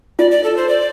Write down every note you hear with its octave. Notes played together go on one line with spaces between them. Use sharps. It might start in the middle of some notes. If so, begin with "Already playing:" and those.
F4 D5
D5
A4
C5
D5